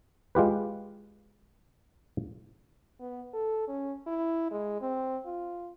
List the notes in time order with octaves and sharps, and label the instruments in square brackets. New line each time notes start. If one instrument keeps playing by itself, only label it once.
[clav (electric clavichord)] G#3 F4 G4 B4
[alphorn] B3
A4
C#4
E4
G#3
C4
F4